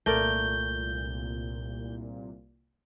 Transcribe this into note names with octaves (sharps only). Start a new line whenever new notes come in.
C2 A#2 A3 A#4 D5 G6